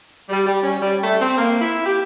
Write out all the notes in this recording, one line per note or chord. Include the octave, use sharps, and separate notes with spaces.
G3
G3
C#4
G3
A3
C4
A#3
E4
G4